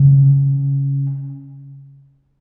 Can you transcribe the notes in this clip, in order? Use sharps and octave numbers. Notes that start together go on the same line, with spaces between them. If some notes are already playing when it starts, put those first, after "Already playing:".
Already playing: C#3